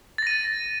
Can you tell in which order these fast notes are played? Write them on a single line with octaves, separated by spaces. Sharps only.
A6 A#6 D#7